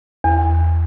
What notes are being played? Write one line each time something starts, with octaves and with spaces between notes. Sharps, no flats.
E2